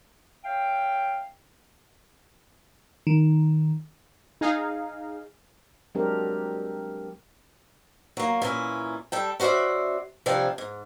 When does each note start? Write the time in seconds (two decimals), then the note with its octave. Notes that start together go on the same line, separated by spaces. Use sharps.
0.44 C#5 E5 F5 G5
3.07 D#3
4.41 D#4 G#4 F5
5.95 F#3 G#3 C4 D4 G4 A#4
8.17 F#3 A#3
8.42 A#2 E3 C#4
9.12 G3 A4 G5
9.40 C#4 F#4 C5 D5 E5
10.26 C3 F3 G3 D4 G5 G#5
10.58 G#2